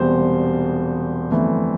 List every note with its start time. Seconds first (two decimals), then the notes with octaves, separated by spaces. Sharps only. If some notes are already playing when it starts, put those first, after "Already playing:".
Already playing: E1 E2 C3 G3 C5
1.31 G1 F2 E3 A3